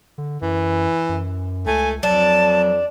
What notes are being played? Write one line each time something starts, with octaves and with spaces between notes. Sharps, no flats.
D3
F#2 E3
F#2
C#2 A3 G#5
F2 F#3 D4 A5